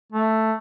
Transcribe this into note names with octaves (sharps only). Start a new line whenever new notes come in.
A3